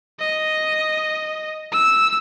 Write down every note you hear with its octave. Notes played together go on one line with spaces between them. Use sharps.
D#5
E6